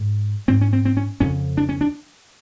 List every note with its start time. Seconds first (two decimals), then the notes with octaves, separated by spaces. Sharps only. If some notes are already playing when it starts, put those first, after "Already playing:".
Already playing: G#2
0.48 G#2 C4
0.61 C#4
0.73 C4
0.85 C4
0.97 C#4
1.20 F2 C#3 C#4
1.57 D4
1.69 C#4
1.81 D4